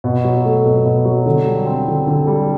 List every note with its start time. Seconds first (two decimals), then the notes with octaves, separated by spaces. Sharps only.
0.04 B2
0.24 F#3
0.44 A3
0.65 B2
0.85 B2
1.05 F#3
1.26 D3
1.46 G3
1.66 C4
1.87 D3
2.07 D3
2.27 G3